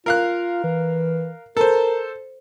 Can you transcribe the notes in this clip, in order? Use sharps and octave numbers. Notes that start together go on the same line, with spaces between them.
F4 A#4 F5 F#6
E3
A4 A#4 C5